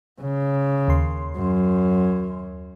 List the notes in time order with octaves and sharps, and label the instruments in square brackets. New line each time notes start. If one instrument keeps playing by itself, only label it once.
[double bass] C#3
[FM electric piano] D#2 C6
[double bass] F#2